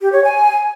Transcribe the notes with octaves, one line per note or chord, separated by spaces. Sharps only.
G4
C#5
G#5